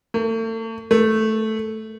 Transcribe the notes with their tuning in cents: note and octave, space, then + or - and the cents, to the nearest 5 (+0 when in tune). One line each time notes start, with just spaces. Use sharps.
A3 +40
A3 -5